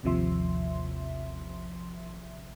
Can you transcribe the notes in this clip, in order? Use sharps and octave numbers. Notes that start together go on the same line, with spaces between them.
A1 D#2 C3 F3 E5 C6